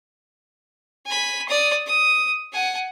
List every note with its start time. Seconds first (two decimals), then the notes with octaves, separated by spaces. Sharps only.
1.06 G#5 B5
1.48 D5 D#6
1.86 D#6
2.52 F#5 G#5